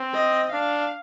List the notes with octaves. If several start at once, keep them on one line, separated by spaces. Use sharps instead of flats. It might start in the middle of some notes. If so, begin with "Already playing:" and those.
Already playing: C4
D#5
D4 F5